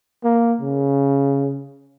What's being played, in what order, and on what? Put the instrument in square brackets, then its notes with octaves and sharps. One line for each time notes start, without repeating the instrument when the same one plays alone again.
[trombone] A#3
C#3